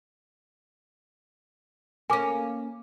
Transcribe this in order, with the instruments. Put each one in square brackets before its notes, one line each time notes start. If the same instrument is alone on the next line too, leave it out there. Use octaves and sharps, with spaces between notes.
[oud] A#3 C#4 [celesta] G#5 D6